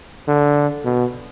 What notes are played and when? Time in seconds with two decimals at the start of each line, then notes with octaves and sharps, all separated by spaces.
0.28 D3
0.85 B2